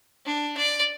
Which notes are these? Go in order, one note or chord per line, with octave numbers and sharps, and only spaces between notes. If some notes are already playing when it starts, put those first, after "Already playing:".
D4
D5